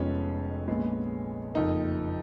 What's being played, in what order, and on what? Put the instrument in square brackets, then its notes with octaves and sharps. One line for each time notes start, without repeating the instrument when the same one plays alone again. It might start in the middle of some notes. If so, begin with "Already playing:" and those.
Already playing: [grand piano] F1 F2 F3 G#3 B3 C#4
A#1 A#2 G#3 B3
F#1 F2 F3 A#3 D#4